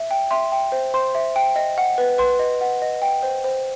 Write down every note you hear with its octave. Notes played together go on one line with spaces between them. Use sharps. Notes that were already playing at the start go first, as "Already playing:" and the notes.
Already playing: E5
G5
E5 C6
G5
C5
C5 C6
E5
G5
D#5
F#5
B4
B4 C6
D#5
F#5
D#5
G5
C5
C5